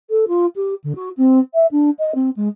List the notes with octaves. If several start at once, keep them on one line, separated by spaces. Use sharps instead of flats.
A4
F4
G4
D3
F#4
C4
E5
D4
D#5
C4
G#3